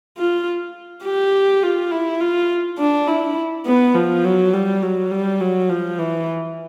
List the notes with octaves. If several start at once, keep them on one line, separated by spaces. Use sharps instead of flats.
F4
G4
F4
E4
F4
D4
E4
B3
F3
F#3
G3
F#3
G3
F#3
F3
E3